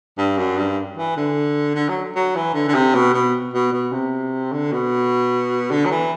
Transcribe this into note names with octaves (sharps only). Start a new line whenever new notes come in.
G2
F#2
G2
E3
D3
D3
F#3
F#3
E3
D3
D3
C3
B2
B2
B2
B2
C3
D3
B2
D3
F#3
E3